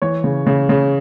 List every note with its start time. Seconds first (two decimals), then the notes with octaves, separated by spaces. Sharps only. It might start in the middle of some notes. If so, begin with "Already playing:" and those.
0.02 E3 C#5
0.24 C#3
0.47 C#3
0.69 C#3